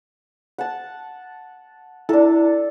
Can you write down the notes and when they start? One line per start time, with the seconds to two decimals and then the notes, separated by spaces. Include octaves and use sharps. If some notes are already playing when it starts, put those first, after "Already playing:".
0.58 F#5 A5
2.09 D4 E4 A4